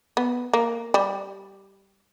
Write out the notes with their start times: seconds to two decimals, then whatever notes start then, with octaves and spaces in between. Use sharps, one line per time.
0.17 B3
0.53 A#3
0.94 G3